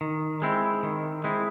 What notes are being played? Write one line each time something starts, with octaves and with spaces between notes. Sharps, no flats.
D#3
G#3 C4 E4
D#3
G#3 C4 E4